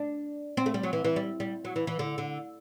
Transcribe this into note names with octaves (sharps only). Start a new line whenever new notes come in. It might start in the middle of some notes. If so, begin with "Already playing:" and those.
Already playing: D4
C4
A3
G3
F#3
E3
E3
G3
G3
F#3
E3
E3
D3
D3